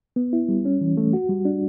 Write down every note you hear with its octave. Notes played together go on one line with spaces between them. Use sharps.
B3
E4
G3
C#4
E3
A3
F#4
G3
D4